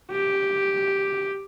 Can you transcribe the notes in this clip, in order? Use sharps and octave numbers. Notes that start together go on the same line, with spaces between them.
G4